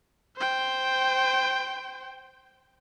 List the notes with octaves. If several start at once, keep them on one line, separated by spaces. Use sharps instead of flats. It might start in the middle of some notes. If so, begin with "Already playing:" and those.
C5 G5